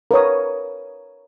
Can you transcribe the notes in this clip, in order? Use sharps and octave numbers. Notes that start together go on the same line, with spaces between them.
A#4 B4 C#5 D#6